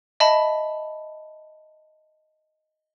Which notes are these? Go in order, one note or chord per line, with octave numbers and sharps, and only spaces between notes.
D#5 E5 A5 B5